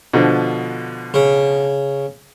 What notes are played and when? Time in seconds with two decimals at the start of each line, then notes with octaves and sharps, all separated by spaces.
0.14 B2 D3 F3
1.14 C#3